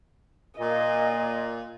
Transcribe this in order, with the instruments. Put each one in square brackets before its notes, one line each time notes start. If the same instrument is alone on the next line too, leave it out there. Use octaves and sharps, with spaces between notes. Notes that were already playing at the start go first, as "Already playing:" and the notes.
[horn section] A#2 [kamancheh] D#5